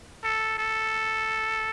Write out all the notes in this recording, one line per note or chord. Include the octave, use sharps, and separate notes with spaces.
A4
A4